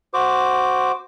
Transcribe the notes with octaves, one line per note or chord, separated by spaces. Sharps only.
F#4 C5 D6